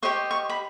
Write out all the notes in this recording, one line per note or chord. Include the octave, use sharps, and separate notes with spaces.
G4 C5 D#5 C#6
C#6
B5